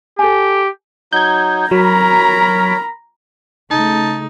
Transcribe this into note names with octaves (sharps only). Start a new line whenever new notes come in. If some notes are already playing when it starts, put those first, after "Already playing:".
G4 A4 G#5
F#3 D#4 G6 G#6
F#3 A#4 C#5 A#5 B5
C#3 A3 D#4 A5